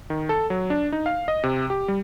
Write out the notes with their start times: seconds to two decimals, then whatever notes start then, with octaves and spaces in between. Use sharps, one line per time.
0.10 D#3
0.29 A4
0.50 F#3
0.70 D4
0.92 D#4
1.06 F5
1.28 D#5
1.43 C3
1.70 G4
1.88 G3